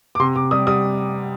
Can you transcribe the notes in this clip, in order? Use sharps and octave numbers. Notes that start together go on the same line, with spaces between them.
D6
C3 C6
C3 D6
G3 D#6
G3 D#6